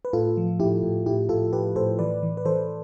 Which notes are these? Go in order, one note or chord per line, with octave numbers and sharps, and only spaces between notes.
B4
A2 F4 A4
F3
A2 E4 G4
A2
A2 E4 G4
A2 F4 A4
A2 G4 B4
A2 A4 C5
E3 B4 D5
E3
B4
E3 A4 C5